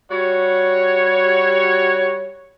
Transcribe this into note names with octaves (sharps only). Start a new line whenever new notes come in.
G3 F#4 C#5